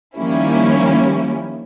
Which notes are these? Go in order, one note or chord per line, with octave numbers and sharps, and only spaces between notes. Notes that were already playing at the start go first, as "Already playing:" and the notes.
D#3 F3 G3 A#3 C#4 E4